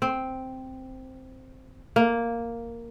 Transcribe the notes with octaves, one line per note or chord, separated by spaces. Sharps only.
C4
A#3